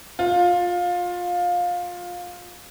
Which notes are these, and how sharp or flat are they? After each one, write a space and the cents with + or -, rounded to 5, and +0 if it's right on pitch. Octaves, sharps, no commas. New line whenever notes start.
F4 +20